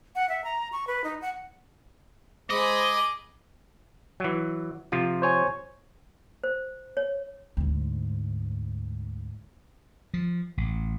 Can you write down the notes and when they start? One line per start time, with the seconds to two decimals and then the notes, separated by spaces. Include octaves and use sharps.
0.15 F#5
0.29 E5
0.44 A#5
0.72 C#6
0.87 B4
1.04 D#4
1.22 F#5
2.50 G#3 G#4 C5 D#5 B5 D6
4.20 E3 F#3
4.92 C3 F3 F4
5.22 C5 C#5 G#5
6.44 C5
6.97 C#5
7.57 D2 G#2
10.14 F3
10.57 A1